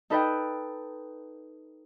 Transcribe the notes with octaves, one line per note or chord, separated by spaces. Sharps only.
D#4 A4 B4 D#5 G5